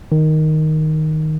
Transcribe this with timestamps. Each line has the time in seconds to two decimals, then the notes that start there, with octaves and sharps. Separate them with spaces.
0.12 D#3